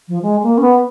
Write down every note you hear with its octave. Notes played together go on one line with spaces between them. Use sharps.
F3
G#3
A#3
C#4
B3